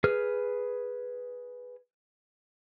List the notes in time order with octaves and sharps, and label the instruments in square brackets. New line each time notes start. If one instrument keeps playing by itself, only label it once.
[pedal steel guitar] G#4 B4 F6